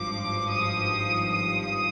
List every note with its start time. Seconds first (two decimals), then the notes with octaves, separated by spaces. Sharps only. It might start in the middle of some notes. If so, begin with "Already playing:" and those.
Already playing: G#1 G2 F3 D6
0.50 D#6
1.33 D#6